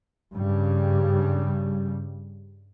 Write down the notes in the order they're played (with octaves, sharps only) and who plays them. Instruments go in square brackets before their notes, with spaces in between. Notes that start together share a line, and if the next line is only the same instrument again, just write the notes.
[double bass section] G2 C#3 G3